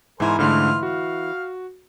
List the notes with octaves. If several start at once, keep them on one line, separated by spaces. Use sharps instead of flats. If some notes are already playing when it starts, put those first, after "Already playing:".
G#2 E3 E4 A#4 C5 G#5
G#2 D3 A3 F4 F6
F#4 F5